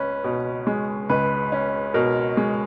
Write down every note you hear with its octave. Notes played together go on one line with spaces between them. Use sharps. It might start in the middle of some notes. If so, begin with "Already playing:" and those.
Already playing: C#2 C#4 B4
B2
G#3
C#2 B4
C#4
B2 A#4
G#3